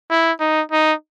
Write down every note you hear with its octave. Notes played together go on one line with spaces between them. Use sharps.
E4
D#4
D#4